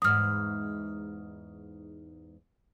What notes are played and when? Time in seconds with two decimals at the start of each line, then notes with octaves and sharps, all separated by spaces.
0.02 E2 G#2 D#6 F6